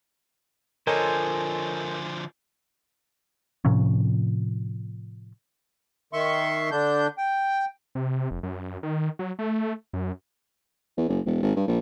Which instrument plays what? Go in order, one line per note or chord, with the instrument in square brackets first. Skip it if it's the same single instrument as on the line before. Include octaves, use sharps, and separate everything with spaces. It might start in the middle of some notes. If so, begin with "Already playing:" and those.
[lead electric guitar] D3 F3 [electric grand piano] A4 C#5 D#5 [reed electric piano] A#4 [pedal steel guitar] C5 G#5
[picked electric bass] A2 C3 F3 C#4
[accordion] D#3 E5 C6 C#6
D3 D4 G6
G5
[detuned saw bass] C3
F1
F#2
D#3
F#3
A3
F#2
[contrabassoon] E2
F#1
E1
G#1
G2
A#1